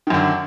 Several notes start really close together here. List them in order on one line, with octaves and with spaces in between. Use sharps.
D#3 F#2 D3